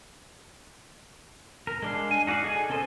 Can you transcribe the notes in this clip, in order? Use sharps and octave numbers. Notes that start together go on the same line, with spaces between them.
A#4
G#3 D4 F5
G#5
D#4 F#4 D5 F5
G#4 A4 G#5
C#4 A4 A#4 C5 D#5